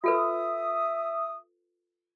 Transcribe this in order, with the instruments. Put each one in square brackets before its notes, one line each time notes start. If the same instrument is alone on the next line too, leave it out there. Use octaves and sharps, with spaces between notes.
[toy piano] F4 A4 B4 [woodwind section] E5 D#6